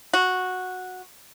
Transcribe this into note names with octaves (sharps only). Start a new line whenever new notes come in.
F#4